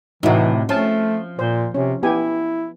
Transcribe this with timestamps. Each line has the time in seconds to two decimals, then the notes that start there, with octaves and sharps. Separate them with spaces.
0.23 A2 C3 E3 D#4 E4 F#4
0.69 F3 A3 C#4 A5
1.39 A#2 C5
1.74 C3 C#4
2.03 B3 E4 G4 G#5